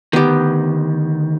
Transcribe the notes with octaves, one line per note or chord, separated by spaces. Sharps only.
D2 D#3 B3 G4